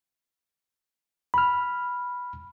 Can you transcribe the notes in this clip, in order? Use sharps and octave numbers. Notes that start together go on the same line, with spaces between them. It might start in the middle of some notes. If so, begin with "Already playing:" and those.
B5 F6